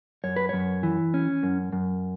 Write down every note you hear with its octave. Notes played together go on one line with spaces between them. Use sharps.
F#2 C#5
B4
F#2 C#5
E3
C#4
F#2
F#2